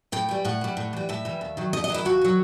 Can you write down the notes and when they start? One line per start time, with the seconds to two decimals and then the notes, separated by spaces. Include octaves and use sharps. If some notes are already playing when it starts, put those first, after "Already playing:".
0.12 A2 G5
0.29 E3 G3
0.45 A2 F#5
0.61 E3 G3
0.77 A2
0.93 E3 G3
1.09 A2 E5
1.25 E3 G3
1.41 D#2
1.57 D#3 F#3
1.73 D#2 D#5
1.84 D#5
1.90 D#3 F#3 E4
2.05 D#2 F#4
2.22 D#3 F#3